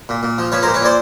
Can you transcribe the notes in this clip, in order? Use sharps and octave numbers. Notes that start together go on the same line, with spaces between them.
A#2
A#2
F3
F3 B4 C#5
A#2 A#4 C5
B4 C#5
A#2 C5 D5